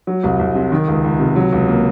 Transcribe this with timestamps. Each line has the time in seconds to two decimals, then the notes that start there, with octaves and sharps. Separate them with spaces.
0.07 F#3
0.23 C2
0.39 C2
0.55 C3
0.72 D#3
0.88 C#2
1.04 C#2
1.20 C3
1.36 F#3
1.53 C#2
1.68 A#3